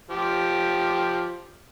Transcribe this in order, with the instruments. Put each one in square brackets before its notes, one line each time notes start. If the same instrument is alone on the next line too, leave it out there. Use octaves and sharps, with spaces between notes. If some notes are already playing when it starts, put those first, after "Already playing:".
[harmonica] F3 G4